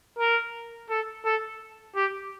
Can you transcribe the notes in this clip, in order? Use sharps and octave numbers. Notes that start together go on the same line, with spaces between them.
A#4
A4
A4
G4